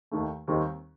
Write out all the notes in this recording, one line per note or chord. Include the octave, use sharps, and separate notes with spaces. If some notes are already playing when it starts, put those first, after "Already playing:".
D#2 D#3 A3
D#2 D#3 G3 C4 D#4